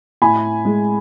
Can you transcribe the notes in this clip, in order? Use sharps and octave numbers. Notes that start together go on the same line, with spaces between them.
A2 G#5 B5
G#3